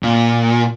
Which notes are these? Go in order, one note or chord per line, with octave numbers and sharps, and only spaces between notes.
A#2